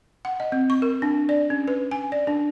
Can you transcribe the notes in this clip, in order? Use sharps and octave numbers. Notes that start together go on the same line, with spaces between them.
F#5
D#5
C4
C#6
A#4
D4
D5
C#4
B4
G#5
D5
D4